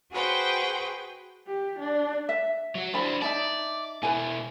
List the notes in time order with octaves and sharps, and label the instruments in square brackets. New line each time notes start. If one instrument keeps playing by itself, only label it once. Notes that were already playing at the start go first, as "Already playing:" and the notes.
[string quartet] F#4 G#4 B4 C5 G5
[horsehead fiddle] G4
D4
[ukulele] E5
[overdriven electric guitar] F#3 F#4
[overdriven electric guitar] D4 C5 [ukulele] E4 A5 B5
[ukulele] D#4 E5 A5 [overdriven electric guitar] D5
[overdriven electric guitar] B2 E4 [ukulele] B4 G#5